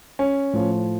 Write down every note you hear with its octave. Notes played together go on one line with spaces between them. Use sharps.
C#4
A2 F3